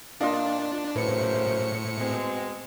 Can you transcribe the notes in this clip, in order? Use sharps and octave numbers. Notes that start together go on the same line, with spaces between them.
A#2 D4 F4 D#5 F5
F#2 A2 C#3 B4 C5 C#7
B2 G#3 C4